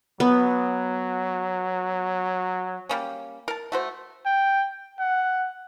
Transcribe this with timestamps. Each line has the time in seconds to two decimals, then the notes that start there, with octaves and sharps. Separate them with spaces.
0.20 F#3 B3
2.89 G3 A#3 C#4
3.48 A#4 A5
3.72 A3 F#4 C5
4.26 G5
4.99 F#5